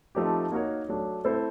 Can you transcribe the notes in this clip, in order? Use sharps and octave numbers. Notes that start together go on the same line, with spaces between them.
F3 A3 C4 D#4 G4
A#3 D#4 F#4 A#4 C#5
F#3 A3 D4
A3 C4 E4 A4 C5